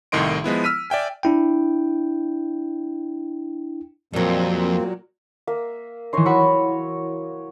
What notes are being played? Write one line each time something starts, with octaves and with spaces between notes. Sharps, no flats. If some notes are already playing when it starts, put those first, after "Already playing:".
C2 A2 D#3 D#5 C6 D7
F3 G#3 B3 E4
E6 F6 B6 D#7
D5 E5 G5 G#5
D4 E4 G5
F2 A#2 F#3 G3 A#3 C4
A#3 E5
E3 D#4 C#5 D#5 C6
F#3 F#4 B5 C#6 E6